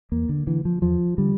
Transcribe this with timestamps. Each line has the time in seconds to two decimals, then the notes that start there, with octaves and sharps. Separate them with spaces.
0.12 E2 A#3
0.29 D3
0.47 D3 E3
0.65 F3
0.82 E2 F3
1.18 D3 G3